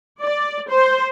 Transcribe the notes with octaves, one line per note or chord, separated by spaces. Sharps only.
D5
C5